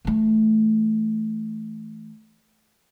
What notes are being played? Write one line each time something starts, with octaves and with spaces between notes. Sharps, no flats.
E3 A3